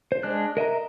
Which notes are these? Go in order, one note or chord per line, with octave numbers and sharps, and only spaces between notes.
C5
G#3 D4 F#6
A#4 D#5 E5 A#5